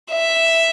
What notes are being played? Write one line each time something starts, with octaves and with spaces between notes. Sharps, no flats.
E5